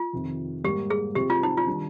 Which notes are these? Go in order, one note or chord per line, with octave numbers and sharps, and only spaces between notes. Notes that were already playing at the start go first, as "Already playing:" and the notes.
Already playing: F4
F2 C3 D#3
G#2 G3 A#3 G4
G#4
C3 F3 C4 G4
F4
D#4
F4
D#3 G3 D4